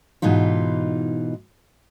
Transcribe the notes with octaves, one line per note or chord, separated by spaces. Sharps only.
G#2 B2 E3 D#4 F4